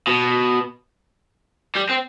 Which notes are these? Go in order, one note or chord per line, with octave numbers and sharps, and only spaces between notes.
B2
G3
C4